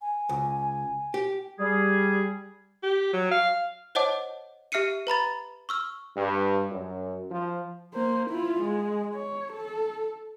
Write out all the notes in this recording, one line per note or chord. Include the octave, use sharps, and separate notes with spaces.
G#5
C#2
G4
G3 G#4
G4
F#3
F5
C5 C#5 D#5 F#5 A5 D6
G4 E5 F6 C7 C#7 D#7
B4 A#5 B5 A6
C#6 E6 F6
G2
F#2
F3
A#3 C5
E4 F4
G#3
C#5
A4